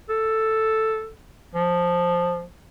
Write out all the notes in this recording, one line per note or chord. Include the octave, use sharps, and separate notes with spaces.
A4
F3